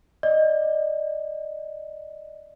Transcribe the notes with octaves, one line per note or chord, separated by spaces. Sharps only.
D5 D#5